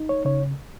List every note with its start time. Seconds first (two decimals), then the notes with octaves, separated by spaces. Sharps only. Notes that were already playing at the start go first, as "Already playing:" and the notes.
Already playing: D#4
0.09 C#5
0.25 C#3 C#5